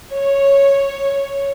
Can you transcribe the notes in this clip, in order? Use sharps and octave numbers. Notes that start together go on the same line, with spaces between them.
C#5